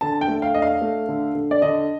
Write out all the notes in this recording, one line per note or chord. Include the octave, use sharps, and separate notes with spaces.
D3 A5
G5
A3
F5
D4 D#5
F5
A3
D3
D3
D5
D3 D#5